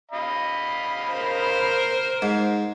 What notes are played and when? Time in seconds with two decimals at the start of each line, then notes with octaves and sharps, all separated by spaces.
0.11 D#5 F5 B5
1.12 A#4 C5
2.22 G#2